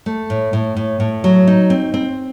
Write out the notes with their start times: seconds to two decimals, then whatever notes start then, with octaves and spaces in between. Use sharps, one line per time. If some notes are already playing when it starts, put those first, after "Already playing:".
0.06 A3
0.30 A2
0.53 A2
0.77 A2
1.00 A2
1.24 F#3
1.47 D#4
1.70 C4
1.94 C4